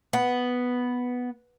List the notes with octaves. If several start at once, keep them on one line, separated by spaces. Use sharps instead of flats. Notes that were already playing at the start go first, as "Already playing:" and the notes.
B3